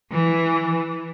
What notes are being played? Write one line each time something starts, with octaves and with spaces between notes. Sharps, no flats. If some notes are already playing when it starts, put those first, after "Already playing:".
E3